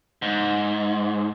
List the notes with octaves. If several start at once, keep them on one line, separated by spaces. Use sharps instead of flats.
G#2